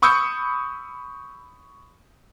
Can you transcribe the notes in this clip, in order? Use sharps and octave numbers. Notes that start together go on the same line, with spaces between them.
B5 C#6 D#6 E6 G6 C#7